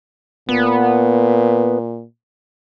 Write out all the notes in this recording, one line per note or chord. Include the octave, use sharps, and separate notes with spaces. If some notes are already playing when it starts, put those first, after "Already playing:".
A#2 B3